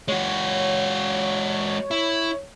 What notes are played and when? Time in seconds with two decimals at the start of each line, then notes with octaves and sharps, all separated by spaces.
0.08 G#3 F#4 C#5
1.91 E4